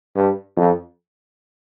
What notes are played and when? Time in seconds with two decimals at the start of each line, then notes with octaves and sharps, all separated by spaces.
0.16 G2
0.57 F2